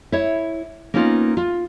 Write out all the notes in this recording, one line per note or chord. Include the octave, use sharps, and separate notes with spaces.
E4 C#5
A#3 B3 C#4 D#4 F4
F4